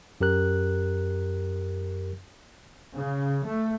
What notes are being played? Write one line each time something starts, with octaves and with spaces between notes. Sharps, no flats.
F#2 G4 A#4 F#6
C#3
A3